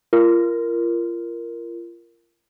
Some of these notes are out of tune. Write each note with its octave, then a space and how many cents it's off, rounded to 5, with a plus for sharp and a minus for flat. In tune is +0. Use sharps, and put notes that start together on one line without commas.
F4 -30 A#4 +0